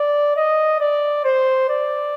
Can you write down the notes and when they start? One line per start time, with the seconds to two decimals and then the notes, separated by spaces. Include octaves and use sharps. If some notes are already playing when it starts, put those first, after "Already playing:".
Already playing: D5
0.36 D#5
0.80 D5
1.24 C5
1.69 D5